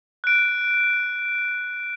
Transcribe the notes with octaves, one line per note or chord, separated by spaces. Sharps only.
F#6 D7